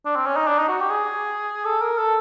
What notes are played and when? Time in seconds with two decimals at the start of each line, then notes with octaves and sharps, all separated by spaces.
0.06 D4
0.16 C4
0.26 C#4
0.36 D#4
0.47 D4
0.59 D#4
0.69 F#4
0.80 G4
0.90 G#4
1.65 A4
1.82 A#4
1.98 A4